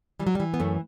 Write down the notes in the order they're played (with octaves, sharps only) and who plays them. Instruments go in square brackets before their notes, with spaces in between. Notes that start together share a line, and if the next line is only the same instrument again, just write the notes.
[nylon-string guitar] E3 G3
F#3
G3
E3
B3
F#2 A3